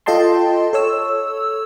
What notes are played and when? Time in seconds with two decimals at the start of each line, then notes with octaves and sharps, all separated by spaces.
0.06 F4 A4 D#5 G5 A5 C6
0.73 A4 C#5 E6